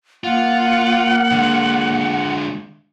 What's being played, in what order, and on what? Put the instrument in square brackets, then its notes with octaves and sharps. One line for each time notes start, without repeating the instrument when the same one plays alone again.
[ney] A#3 [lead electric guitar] F4 [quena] F#5
[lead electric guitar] D3 G#3